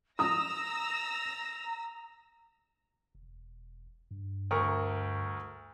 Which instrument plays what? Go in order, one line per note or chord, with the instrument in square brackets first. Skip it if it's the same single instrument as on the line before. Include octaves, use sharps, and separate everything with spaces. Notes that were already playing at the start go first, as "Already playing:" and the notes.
[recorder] A#5 [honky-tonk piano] D#6 [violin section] E6 A#6
[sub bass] E1
G2
[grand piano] D2 A#4 C#6